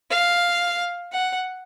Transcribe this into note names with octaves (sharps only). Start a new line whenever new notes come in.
F5
F#5